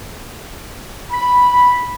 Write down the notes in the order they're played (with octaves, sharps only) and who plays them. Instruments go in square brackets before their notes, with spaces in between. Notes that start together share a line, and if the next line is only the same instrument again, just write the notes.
[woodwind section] B5